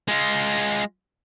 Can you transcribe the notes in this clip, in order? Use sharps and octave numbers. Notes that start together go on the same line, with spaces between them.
G#3 F4